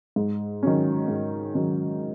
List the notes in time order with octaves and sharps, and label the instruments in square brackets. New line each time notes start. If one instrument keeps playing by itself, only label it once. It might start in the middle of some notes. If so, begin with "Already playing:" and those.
[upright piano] G#2
D#3 F#3 C#4
G#2
D#3 F#3 C#4